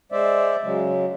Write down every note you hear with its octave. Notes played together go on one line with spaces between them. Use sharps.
G#3 C5 D5 E5
C#3 F#3 G#3